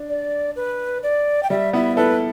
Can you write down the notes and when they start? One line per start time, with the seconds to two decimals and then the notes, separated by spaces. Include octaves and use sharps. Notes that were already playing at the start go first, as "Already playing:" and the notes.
Already playing: D4
0.09 D5
0.56 B4
1.03 D5
1.43 G5
1.50 G3 E5
1.73 B3 E4 E5
1.97 E4 A4 B4